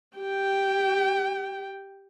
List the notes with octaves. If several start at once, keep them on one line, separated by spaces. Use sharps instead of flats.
G4 G5